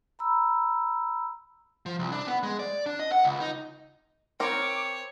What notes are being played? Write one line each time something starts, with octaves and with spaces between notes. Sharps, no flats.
A#5 B5 E6
F3
C2
D4
B3
G#3
D5
D4
D#5
F#5
C#2
D#4
C4 A#4 C#5 D6